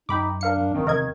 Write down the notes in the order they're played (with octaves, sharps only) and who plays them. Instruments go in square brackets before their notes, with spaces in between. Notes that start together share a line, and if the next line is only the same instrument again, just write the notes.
[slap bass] F#2 [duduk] D#4 [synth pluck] G5 B5 D6
[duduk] D4 [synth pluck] A#4 F5 C#7
[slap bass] F#2
[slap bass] G#1 F#2 C4 [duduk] D#3
[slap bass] E2 C3 [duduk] D#3 [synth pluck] A#4 D#5 G#6